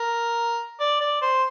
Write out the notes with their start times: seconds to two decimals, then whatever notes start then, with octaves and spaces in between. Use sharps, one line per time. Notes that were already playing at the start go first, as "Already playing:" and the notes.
Already playing: A#4
0.80 D5
1.00 D5
1.22 C5